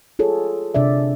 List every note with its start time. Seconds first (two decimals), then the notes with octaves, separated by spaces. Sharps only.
0.19 F4 G#4 A4 C#5
0.74 C3 D4 D5 E5